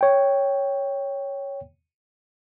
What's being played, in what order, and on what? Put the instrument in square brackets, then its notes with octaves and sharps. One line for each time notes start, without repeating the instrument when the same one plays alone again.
[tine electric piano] C#5 G5